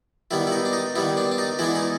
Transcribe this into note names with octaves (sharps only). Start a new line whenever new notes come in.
D#3 G3 B3 E4
E4
D#4
D4
D#4
D#3 G3 B3 E4
D4
D4
D#4
E3 G#3 B3 D4 E4
D#4